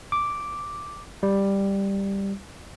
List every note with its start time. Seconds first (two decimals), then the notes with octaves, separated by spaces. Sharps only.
0.12 D6
1.23 G3